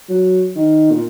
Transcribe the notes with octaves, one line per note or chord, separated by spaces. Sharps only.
F#3
D#3
A#2